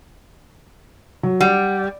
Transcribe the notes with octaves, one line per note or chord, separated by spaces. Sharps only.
F#3
G3 D5 F#5